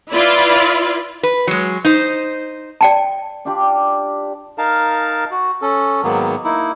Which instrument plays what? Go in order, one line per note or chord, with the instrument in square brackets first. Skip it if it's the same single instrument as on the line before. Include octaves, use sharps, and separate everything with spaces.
[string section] E4 F4 B4 D5
[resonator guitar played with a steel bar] B4
F#3 G#3
D#4 C5
[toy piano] D5 G5 A5
[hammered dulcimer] D4 F4 G4 D5
[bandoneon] D#4 A#4 F5 A5
F#4
C#4 A4
G#2 D#3 F#3 A#3 B3
A#3 D#4 E4